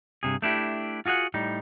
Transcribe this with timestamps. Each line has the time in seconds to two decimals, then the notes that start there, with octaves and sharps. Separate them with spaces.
0.23 G2 C3 G#4
0.42 A3 D4 E4 G4
1.06 F4 F#4 G#4 F5 F#5
1.34 A2 G3 D#4